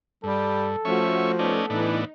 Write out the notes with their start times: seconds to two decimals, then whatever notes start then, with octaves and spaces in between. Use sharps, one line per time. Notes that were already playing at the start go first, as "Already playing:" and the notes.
0.24 G2 G3 A4
0.85 F3 A3 C#4 F#4 E5 C#6
1.39 A3 B3 C#4 D#4 A4 D5
1.70 A2 E3 B3 D4 D#4